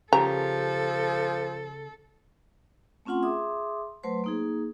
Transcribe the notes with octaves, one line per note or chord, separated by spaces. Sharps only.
C#3 F3 G4 A4 A#4 A#5
A3 C4 C#4 F4 F#5 C6
G#4 E5 C6 D6 D#6
F#3 A3 B4 C5 C6
A#3 D#4 G#4